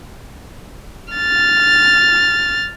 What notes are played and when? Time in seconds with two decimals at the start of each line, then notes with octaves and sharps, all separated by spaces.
1.14 F6 A6